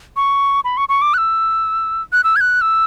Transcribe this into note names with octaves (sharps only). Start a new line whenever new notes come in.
C#6
B5
C#6
C#6
D6
F#6
E6
F#6
E6
G#6
F#6
E6